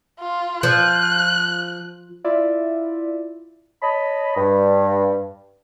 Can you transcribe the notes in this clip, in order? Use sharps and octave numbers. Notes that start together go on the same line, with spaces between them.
F4
F3 F#6
E4 F4 D5 E5
C#5 D#5 A5 B5
G2